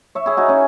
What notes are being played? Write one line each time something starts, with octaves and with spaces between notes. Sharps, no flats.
C#5 E5
E4 G#4
D#4 F#4
C#4 E4